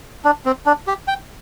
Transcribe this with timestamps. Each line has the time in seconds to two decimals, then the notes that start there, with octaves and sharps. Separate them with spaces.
0.25 D4
0.45 C4
0.66 D4
0.87 G4
1.08 G5